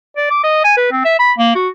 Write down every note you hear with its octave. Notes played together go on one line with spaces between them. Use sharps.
D5
D6
D#5
G#5
B4
C4
E5
B5
A#3
F#4